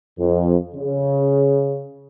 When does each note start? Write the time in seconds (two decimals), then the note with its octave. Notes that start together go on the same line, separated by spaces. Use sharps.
0.17 F2
0.75 C#3